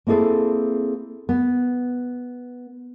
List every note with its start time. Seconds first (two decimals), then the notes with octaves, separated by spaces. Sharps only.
0.07 A#3 C4 E4 G#4 A4
1.29 B3